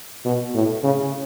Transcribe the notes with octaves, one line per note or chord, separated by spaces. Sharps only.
B2
A2
C#3